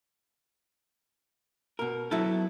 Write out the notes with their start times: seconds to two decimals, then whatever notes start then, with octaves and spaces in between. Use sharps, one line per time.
1.79 B2 A#4
2.11 F#3 B3 E4 A4